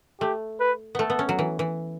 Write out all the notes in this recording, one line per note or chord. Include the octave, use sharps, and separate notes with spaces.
A3 G4
B4
A3 B3 A4
B3
C#4
F#3
E3
E3